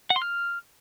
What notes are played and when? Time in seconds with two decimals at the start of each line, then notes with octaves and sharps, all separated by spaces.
0.10 F#5
0.16 C6
0.22 F6